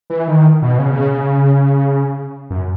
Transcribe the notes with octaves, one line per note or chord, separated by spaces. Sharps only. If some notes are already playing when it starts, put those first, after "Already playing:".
E3
D#3
B2
C#3
B2
C#3
F#2